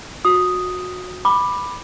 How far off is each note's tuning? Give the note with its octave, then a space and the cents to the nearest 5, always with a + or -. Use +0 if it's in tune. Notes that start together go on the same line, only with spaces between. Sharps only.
F#4 -25 D#6 +0
B5 +0 D6 +15